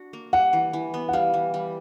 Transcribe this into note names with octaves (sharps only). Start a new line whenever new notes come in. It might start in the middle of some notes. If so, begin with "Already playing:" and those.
Already playing: D4 F#4
A#3
G3 F#5
E3
E3
B3
F#5
G3 F5
E3
G3